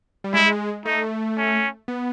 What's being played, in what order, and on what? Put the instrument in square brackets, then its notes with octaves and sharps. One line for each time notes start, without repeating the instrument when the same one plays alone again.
[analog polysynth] G3
[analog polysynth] G#3 [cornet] E4
[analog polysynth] A3 [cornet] D#4
[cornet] C#4
[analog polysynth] B3